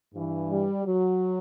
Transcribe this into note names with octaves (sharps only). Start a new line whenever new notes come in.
G2 E3
G3
F#3